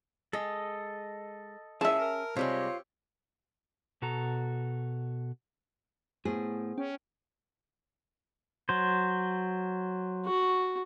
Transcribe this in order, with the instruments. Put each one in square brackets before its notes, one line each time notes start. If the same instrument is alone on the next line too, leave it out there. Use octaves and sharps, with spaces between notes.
[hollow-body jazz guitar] G#3 [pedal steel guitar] A4 D#5
[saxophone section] A#2 G#3 E4 [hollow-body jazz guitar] C#4 G#4 [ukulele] E5 A5
[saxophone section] A#4
[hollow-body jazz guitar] C3 G3 G#3 [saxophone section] C4 G4 C#5 [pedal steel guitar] F4
[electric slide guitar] B2 F#4 A4 A#5
[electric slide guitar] A2 [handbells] B3 C5 [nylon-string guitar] G#4
[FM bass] C#4 [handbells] G5
[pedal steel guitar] F#3 C5
[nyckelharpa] F#4